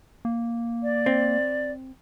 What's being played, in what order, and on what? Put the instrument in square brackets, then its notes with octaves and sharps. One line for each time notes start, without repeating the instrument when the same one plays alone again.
[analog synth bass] A#3
[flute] D5
[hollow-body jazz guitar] C4